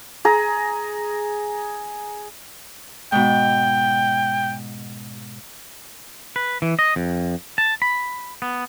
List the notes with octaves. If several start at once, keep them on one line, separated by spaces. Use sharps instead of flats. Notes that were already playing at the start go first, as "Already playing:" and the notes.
G#4 A#5
G#2 B2 G5
B4
E3
D#5
F2
A5
B5
B3